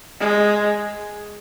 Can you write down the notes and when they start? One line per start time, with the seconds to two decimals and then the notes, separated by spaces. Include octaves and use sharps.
0.20 G#3